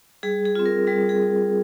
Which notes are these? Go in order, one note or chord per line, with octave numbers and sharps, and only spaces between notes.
G3 G#4
G#4
C4 F4
A#4
G3 G#4
G#4